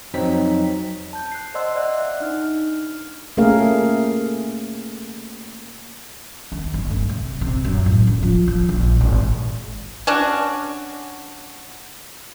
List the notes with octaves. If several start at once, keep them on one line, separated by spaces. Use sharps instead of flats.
F2 F#3 C4 D#4 B6
A5 G6
F#6 C7
C5 D5 D#5 F#5 C6 E6
D5 E5 F#5 E6 F#6
D4 D#4 F6
A3 A#3 C#4 G#4 A#4 F5
D#2
G1
A3
C3
C3
F#2
A2
C#3
F3
F3
A#1
G#1
C#4 D4 F#4